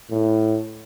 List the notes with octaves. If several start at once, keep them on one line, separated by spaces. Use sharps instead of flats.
A2